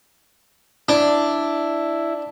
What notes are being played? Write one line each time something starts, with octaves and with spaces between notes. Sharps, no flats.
D4 E4